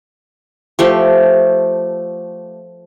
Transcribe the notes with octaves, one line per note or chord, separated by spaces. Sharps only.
F3 A3 G4